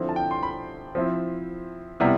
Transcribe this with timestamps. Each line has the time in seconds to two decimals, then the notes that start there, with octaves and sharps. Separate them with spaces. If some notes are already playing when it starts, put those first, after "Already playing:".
Already playing: D3 F3 C4 E4
0.09 A5
0.16 G5
0.31 C6
0.43 B5
0.95 F3 C4 E4
2.00 C3 G3 B3 E4